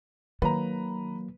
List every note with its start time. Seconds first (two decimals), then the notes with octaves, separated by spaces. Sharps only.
0.42 D#3 F#3 A#3 B4 A#5